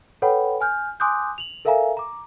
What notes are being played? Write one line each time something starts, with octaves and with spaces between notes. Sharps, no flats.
A4 B4 C#5 F#5 G5 B5
G#5 F6 G6
G#5 C6 D6 D#6 F#6 G6
F7 F#7
A4 A#4 E5 F5 G#5 A#5
A#5 D6